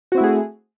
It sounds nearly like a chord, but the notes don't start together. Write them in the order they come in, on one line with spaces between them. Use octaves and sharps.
F#4 C4 E4 A3 G#4